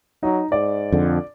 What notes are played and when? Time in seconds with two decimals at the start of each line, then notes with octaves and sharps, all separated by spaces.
0.23 F#3 D#4
0.52 G#2 D5
0.92 F2 D3